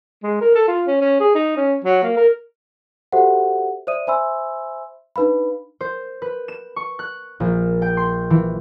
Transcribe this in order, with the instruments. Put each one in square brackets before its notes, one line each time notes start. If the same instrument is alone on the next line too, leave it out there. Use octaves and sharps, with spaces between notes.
[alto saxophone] G#3
A#4
A4
F4
C#4
C#4
G#4
D#4
C#4
F#3
A#3
A#4
[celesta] F#4 G4 A4 C5 E5 F#5
C5 D5 E5 D#6 D#7
C5 E5 G#5 B5 C6 E6
D4 D#4 B4 F5 B5
[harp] C5
B4
E7
C#6
F#6
A#1
G5
C6
E3